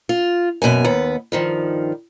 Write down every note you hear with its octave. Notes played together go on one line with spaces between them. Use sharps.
F4
F#2 B2 A#3 G#5
D#2 B3
G2 D#3 F3